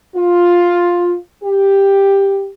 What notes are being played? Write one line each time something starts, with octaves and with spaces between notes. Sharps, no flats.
F4
G4